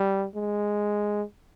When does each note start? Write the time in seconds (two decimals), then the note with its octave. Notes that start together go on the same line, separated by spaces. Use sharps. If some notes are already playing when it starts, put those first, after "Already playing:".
Already playing: G3
0.35 G#3